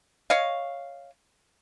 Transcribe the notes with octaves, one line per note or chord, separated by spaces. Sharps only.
C#5 D#5 F5